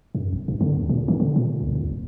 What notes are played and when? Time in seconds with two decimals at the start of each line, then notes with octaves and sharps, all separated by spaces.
0.15 F#2
0.33 G1
0.48 G2
0.61 D3
0.73 D#2
0.89 A#2
1.08 D#3
1.20 D3
1.36 A#2
1.61 C#2
1.75 D#2
1.89 F#1